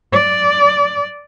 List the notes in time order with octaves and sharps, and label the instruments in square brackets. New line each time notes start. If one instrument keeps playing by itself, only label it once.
[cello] D5